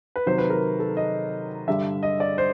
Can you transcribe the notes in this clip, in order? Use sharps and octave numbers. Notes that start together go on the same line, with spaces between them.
B4
C3 D#3 F#3 C5
B4
A#4
A4
D#5
G2 D3 G3 E5
D#5
D5
C5